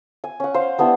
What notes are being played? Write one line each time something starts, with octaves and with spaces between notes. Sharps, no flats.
G#5
C#4 F#5
C5 F5
G3 B3 D4 E4